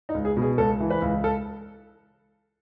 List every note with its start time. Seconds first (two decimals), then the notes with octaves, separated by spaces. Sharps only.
0.09 D#4
0.14 C#2
0.25 G#4
0.37 B2
0.42 G#4
0.58 C#2 A4
0.80 E3
0.90 B4
1.02 C#2
1.24 A4